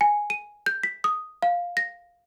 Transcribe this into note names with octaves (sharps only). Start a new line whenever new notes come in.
G#5
D#7
G6
B6
D#6
F5
A#6